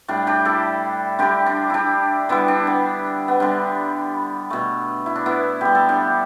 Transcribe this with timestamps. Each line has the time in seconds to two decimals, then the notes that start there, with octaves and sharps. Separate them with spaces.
0.08 A2 G3 D4
0.27 D4 G4
0.45 E4 A4
1.19 D3 G3 D4 G4
1.46 D4
1.70 D4 E4 G4
2.29 D3 G3 B3 E4
2.48 D4
2.67 B3
3.28 B3
3.40 D3 G3 D4
4.50 B2 A3
5.06 E4
5.16 D4
5.26 B3 E4
5.61 D3 G3 G4
5.75 A4
5.89 D4 G4